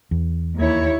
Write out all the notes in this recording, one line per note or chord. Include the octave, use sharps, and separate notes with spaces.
E2
D#2 E4 C#5